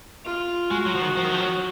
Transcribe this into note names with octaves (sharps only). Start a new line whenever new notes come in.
F4
G#3 F#4
F#3
F3
D#3
F3
D#3
F3
F#3